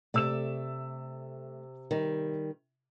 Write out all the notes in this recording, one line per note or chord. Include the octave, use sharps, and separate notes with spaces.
C3 A3 D5 E6 E7
D#3 G3